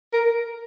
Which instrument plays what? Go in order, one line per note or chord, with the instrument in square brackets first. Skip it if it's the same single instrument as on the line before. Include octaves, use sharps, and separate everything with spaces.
[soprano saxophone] A#4